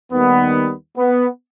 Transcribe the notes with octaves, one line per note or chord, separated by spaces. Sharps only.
D#2 D#3 G3 B3
B3